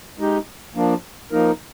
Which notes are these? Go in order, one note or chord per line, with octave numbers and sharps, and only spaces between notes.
G#3 D#4 G4
F3 A#3 D4
F3 A#3 D#4 A#4